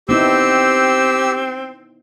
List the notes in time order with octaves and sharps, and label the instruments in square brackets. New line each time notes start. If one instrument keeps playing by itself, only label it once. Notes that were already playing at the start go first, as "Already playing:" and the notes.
[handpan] B3 D#4 E4 [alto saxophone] C4 [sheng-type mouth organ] G4 E6